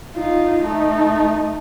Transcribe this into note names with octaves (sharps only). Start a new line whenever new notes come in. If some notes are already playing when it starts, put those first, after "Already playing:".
D#4 F4
A3 D#4